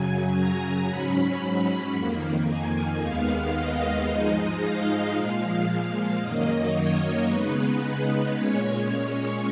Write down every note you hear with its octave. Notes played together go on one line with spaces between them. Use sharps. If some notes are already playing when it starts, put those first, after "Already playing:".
Already playing: F#2 C#3 F#3 G#5
A#5
G#2 F#3 C#4 B5
B5
F2 D#3 A#3
G#5
D#2 D#3 G#3 B3 F5
D#5
G#2 F3 G#3 D#4
F5
A#2 F3 G#3
F5
F#2 D#3 F#3 A#3 D#5
C#5
C#3 G#3 B3 D#4 B4
B4
A#2 G#3 C#4 C#5